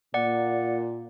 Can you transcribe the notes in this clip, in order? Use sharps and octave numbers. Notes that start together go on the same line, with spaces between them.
A#2 D5 F#5